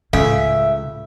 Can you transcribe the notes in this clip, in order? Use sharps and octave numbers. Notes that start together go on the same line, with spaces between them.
C#2 A2 C#4 A4 E5 F5 G#5